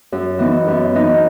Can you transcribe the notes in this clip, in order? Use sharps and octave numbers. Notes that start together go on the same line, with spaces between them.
F#2
E3 B3 D#4
F#2
E3 B3 D#4